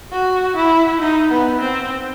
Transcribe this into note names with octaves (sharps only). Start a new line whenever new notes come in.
F#4
E4
D#4
B3
C4